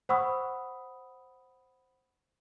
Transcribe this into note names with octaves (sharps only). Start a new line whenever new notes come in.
C5 F#5 B5 C#6 D#6 E6